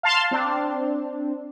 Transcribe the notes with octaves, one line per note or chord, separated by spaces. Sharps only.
F5 A5 C6
C4 D4